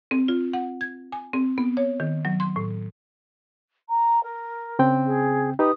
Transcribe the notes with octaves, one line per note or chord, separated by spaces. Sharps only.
C4
F4
F#5
G#6
G#5
C4
B3
C#5
D#3
F#3
C6
A2
A#5
A#4
C#3 C4 G5
G#4
D#4 G4 B4 D#6